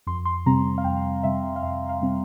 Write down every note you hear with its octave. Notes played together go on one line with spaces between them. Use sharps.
F2 C6
C6
C3 G3 C4 A#5
F5
F2 G5
C3 G3 C4 E5
F5
F2 E5
F5
C3 G3 C4